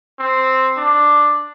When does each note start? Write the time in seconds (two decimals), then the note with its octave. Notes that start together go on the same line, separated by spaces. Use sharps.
0.19 C4
0.77 D4